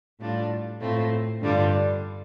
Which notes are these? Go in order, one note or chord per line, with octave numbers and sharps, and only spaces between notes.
A2 G3 D4 F4
A2 A3 C4 F4
G2 D3 G3 D4 F4